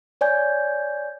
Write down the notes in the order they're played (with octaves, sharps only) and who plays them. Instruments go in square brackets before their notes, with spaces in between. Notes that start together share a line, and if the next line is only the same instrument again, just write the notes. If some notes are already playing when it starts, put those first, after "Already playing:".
[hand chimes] C#5 D5 G#5 G6